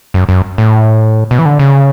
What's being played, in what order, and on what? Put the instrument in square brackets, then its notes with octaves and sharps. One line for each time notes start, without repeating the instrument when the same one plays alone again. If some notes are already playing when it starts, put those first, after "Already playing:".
[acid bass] F#2
F#2
A2
B2
E3
D3
C#3